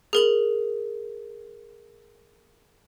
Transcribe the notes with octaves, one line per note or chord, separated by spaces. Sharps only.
G#4 A#4 F#7